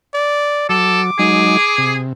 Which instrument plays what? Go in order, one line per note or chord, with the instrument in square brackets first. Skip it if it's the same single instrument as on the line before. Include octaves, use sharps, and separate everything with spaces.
[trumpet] D5
[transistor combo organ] F#3 [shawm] A4 [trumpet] D6
[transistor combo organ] F#3 G#3 D#4 [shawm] G#4
[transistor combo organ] C3